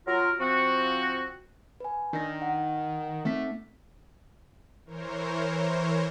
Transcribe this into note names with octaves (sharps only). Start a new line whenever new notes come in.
F#3 F4 A#4
F3 C4 F#4
B4 G#5
D#3 D4 A#6
F#5
A3 C4 D#4 B6
E3 A#4 C5 C#5